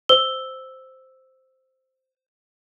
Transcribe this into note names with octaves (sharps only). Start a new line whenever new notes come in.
C5 E6 G7